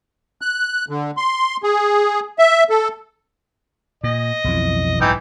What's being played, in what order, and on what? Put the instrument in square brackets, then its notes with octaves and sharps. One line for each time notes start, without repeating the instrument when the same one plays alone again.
[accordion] F#6
D3
C6
G#4
E5
A4
[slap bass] A#2 [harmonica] D#5
[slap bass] B1 F2 E3
[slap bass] B1 G#2 B2 [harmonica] E3 D#4 G5